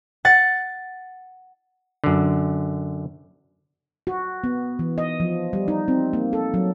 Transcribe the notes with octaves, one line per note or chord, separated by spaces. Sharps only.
F#5 A6
F#2 D3
F#4
B3
E3
D#5
F3
G3
D#4
C4
A#3
A4
F#3